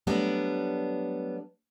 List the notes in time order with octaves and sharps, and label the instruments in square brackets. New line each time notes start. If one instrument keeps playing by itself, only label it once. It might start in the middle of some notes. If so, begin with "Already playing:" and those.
[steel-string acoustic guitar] F#3 G3 A3 B3 D4